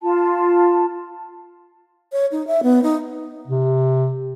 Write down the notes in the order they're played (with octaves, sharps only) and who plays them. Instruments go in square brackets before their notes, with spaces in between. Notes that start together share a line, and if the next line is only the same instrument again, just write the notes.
[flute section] F4 A5
[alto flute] C#5
D#4
E5
B3
D#4
[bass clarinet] C3